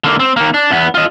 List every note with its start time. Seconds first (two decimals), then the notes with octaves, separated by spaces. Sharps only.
0.04 D3 A#3
0.20 C4
0.36 D#3 A#3
0.54 D4
0.71 E2 B3
0.95 F4 D#5